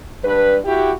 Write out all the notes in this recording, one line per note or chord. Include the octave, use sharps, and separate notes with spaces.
G2 D4 B4
E4 F#4 G4